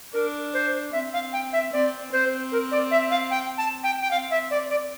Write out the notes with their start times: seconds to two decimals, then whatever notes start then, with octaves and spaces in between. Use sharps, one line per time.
0.13 D4 A#4
0.54 C5
0.92 C4 E5
1.13 F5
1.33 G5
1.53 E5
1.73 C4 D5
2.12 C4 C5
2.52 A#4
2.71 D5
2.91 E5
3.11 F5
3.31 G5
3.58 A5
3.83 G5
4.01 G5
4.11 C4 F5
4.31 E5
4.51 D5
4.70 D5